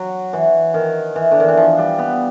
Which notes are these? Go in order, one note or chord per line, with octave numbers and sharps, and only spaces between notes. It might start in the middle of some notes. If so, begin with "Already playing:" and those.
Already playing: F#3
E3
D#3
E3
D3
D#3
E3
F3
G3
B3